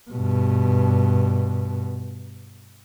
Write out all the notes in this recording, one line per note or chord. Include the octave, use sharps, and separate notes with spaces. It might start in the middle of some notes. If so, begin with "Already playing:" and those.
G2 B2